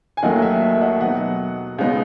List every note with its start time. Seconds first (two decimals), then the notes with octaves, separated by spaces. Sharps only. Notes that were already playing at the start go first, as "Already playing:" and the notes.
0.17 G#5
0.22 D#2 D#3 F#3 A3 D#5 F#5
0.42 E5
0.62 E5
0.81 D#5 F#5
1.00 B2 F#3 B3 D#4 D#5 F#5
1.78 C#2 B2 G#3 B3 D#4